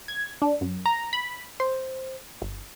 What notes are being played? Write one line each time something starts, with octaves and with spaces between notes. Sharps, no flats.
G#6
D4
F#2
A#5
B5
C5
G1